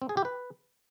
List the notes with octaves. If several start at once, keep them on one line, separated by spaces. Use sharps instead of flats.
C4
G#4
G4
B4